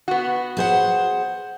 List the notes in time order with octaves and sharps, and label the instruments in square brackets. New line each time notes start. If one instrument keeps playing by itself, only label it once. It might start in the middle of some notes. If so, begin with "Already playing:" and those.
[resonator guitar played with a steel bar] B3 F#4
[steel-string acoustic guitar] G#4 C5 F#5